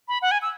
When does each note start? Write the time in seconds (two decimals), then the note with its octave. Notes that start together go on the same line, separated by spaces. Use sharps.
0.08 B5
0.22 F#5
0.31 G#5
0.42 E6